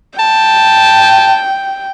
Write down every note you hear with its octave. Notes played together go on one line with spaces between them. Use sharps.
G5 A5